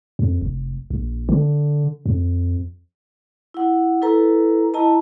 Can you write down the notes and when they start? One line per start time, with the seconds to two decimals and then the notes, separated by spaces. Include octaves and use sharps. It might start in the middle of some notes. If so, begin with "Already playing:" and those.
0.19 F2
0.41 F1
0.90 A#1
1.29 D3
2.06 F2
3.54 E4 F#5
4.02 E4 A4 B4 A#5
4.74 E4 D#5 A5 A#5